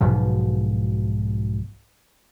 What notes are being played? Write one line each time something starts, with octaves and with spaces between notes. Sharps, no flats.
B1 G#2 B2 F3